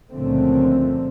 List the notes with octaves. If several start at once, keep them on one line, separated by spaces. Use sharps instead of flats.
C#2 A#2 D3 F3 A3 C4